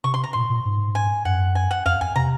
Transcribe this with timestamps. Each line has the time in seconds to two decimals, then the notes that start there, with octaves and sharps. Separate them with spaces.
0.04 C3 C#6
0.14 C6
0.24 A#5
0.33 A#2 C6
0.50 A#2
0.65 G#2
0.95 G#5
1.25 F#2 F#5
1.55 G#5
1.71 F#5
1.86 F2 F5
2.01 F2 G#5
2.15 C3 A#5